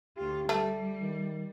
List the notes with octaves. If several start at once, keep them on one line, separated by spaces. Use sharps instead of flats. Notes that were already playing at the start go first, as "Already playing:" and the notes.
D2 F4 G4
G3 A3
D#3